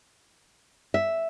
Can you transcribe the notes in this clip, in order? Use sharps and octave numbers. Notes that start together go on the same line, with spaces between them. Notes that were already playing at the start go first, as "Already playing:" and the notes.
E5